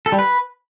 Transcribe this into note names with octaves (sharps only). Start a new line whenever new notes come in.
A4
G3
B4